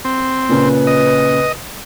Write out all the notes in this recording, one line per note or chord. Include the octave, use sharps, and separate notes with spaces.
C4
A#2 C#3 B4
D#5